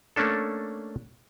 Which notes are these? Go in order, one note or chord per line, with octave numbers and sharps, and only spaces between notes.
A3 A#3 C#4 D4 A4